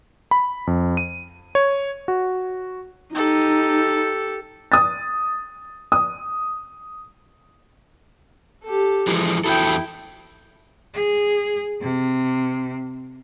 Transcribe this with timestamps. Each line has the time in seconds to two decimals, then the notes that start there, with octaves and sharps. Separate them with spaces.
0.31 B5
0.67 F2
0.97 D#7
1.55 C#5
2.08 F#4
3.15 D#4 G4 A4
4.72 D#6 A6
5.92 D#6
8.64 G4 A4
9.07 E3 F3 G#3
9.44 E2 E4 F#4 A4 G5
10.94 G#4
11.81 C3